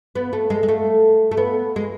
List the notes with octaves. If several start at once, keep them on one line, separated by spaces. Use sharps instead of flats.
B3
A3
G#3
G#3
A3
A3
B3
G#3